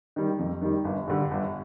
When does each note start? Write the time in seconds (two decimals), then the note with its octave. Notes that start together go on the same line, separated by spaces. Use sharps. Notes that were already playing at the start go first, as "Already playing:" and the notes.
0.16 D#3 G3
0.39 F2
0.62 D#3 G3
0.85 G1
1.08 G2 D3 G3
1.31 G1